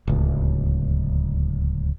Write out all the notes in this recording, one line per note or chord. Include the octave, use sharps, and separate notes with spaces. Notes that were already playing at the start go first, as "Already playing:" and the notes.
D1 C#2